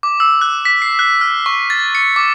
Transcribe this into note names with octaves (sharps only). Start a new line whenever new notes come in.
D6
E6
F#6
B6
C7
F#6
F6
C#6
A6
C#7
D6